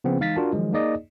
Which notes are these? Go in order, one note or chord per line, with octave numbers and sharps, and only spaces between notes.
C#3 F3 B3 C4
E3 G#3 D#4 F5 A6 B6
D4 F4 F#4 A#4 A5
D#3 F3 F#3 G#3
A#3 D#4 G#4 D5 D#5